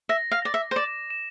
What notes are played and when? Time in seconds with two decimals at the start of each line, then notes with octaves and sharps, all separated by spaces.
0.09 E5 A#6
0.31 F5
0.42 D5 A#6
0.54 E5
0.71 C5
0.76 D5 E7
1.10 E7